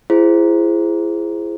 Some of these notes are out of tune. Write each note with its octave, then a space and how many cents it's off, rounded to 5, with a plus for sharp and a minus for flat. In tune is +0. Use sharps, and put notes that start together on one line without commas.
E4 +35 G#4 +0 C5 +0